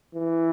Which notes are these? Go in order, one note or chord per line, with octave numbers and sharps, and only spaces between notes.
E3